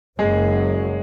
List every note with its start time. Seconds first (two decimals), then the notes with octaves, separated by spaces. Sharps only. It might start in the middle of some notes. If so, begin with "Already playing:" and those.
0.19 F#1 F#2 F#3 G#3 G#4